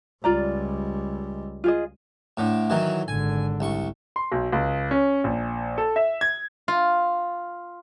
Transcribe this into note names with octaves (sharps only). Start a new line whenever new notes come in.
C#2 G3 F4 D5 A#5
F4 G#4 D#5
A2 D3
D#3 E3 F#3
G#1 D3 G#5
C2 C#6
C6
B1
C#2
C#4
A#1
A4
E5
G#6
F4